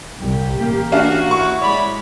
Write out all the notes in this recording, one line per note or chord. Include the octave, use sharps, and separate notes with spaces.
C2 G4
A1 A#3
C#4 D4 F#4 F5
E4 C#6
G#3 C#5 D5 B5